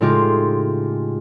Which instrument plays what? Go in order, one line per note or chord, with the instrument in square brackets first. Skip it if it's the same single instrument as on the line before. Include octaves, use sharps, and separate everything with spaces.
[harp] A2 C#3 G#3 D#4 F4 G4